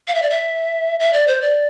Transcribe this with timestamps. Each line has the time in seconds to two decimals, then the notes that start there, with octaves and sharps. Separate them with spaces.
0.08 F5
0.15 E5
0.22 D5
0.30 E5
1.00 E5
1.13 D5
1.28 C5
1.42 D5